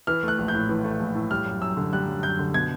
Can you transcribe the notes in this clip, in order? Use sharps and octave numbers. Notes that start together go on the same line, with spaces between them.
E3 F6
A3 F#6
A#1
G6
A2
E3
A3
A#1
A2
G3 F6
F#2
F#2 E6
D3
G3 F#6
F#2
F#2 G6
D3
B2 G#6